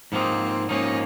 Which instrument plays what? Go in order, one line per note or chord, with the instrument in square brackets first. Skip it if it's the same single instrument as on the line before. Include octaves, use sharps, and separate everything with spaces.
[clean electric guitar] G#2 F3 A#3 D#4 [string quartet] C4
[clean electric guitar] G#2 F3 A#3 D#4 [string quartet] C#4